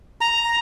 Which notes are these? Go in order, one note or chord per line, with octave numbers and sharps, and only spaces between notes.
A#5